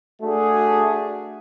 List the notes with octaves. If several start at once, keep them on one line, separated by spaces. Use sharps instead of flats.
A3 D4 F#4 G#4